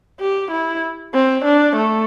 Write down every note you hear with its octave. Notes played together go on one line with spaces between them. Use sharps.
G4
E4
C4
D4
A3